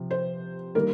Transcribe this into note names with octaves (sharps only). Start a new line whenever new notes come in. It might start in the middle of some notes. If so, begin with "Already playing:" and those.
Already playing: C3 F3
C5
D#3 G3 A#3 A#4